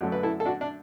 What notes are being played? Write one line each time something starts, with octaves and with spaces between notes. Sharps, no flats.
F#2 D3 F#3 A3
B4
E4 A4
A4
D4 F#4
D4